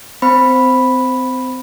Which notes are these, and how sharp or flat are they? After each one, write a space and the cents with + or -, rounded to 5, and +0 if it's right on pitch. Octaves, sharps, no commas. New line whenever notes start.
C4 -30 C5 +0 B5 +0